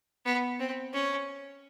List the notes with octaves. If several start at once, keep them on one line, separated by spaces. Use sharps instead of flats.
B3
C4
C#4